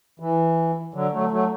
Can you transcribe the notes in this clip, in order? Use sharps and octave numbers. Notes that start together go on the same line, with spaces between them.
E3
D3 F#3
F#3 A3
F#3 A3